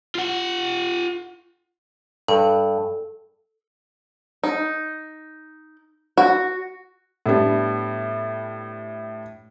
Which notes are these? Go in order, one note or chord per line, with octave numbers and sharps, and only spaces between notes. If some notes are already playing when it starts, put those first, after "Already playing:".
F4 F#5
G2 A4
D#4
F#4
A2 G3 B3 D4